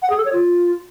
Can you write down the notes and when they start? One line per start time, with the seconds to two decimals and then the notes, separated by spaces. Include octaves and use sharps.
0.02 F#5
0.09 G#4
0.17 A4
0.25 C#5
0.32 F4